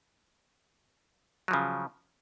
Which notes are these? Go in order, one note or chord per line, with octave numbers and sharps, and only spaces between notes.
C#3 F3 F#3